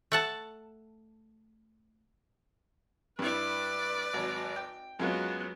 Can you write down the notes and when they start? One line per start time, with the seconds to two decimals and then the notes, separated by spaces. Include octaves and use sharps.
0.12 A3 F#5 A5
3.19 G2 E4 B4 D5
4.14 G#1 F#3
4.56 G5
5.00 F#2 F#3 G#3 B3 F4